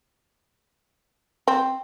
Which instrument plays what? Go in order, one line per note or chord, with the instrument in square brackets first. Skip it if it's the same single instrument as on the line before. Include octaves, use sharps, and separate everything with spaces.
[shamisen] C4